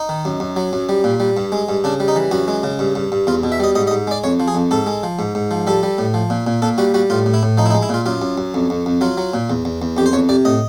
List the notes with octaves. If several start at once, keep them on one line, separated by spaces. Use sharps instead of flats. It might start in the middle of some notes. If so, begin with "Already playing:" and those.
Already playing: D#4
D#3
F#2
F#2
F#3
F#2
G3
A#2
G3
G2
G#3
G2
C#3 D4
G3
D#4
E3
F#2 F#4
G#3
C#3
G2
G2
G2
E2 F4
B2
E5
G3 D#5
G#2 D#5
D#5
G#2
G#3 D5
F2 C#5
F3
G#4
F2
G#2 A4
G#3
F3
G#2
G#2
F3
G3 A4
G3
A2
F3
A#2
A#2
A#2 A4
G3 F#4
G3 F#4
A2 F4
A2
E4
A2
F3 D#4
E4
D#4
G#3
E4
A#2 F4
F#2 F4
F#2
F#2
F2
F2
F2
F#3 F4
F#3
A#2
E2
E2
E2
F2 G4
C5
F2 C#5
C3 D5
A2 D#5